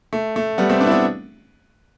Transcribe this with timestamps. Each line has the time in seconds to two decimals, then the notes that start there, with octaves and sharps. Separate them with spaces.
0.13 A3
0.36 A3
0.58 G3 B3
0.69 A3 C4
0.81 B3 D4
0.87 E4
0.91 B3 D4